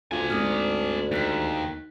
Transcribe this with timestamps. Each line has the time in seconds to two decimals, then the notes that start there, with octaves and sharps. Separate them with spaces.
0.11 D2 D4 F4 G#5
0.30 G#2 C4 D#6 F6
1.12 D#2 D#4 F#6 B6